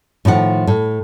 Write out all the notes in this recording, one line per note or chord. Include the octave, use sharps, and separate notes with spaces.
A2 D#3 F3 F#5
A2